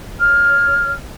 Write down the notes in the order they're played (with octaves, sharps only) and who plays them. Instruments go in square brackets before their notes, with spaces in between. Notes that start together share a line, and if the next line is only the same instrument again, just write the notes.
[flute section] C#5 F6